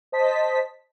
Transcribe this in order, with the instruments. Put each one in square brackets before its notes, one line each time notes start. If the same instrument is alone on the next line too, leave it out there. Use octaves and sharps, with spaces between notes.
[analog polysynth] C5 D#5 A5 B6